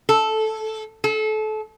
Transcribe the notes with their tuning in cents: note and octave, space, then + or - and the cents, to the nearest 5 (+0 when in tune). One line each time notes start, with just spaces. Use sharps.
A4 -10
A4 -30